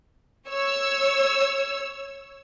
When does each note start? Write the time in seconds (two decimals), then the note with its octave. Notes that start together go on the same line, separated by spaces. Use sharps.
0.50 C#5 E6